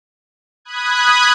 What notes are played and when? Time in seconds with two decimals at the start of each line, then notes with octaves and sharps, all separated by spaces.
0.65 B5 D#6 F#6 G#6